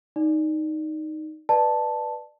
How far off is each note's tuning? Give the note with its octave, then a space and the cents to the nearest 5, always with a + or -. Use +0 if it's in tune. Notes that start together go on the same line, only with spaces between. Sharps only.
D#4 +0 D5 +0
B4 +0 D5 +25 A5 +0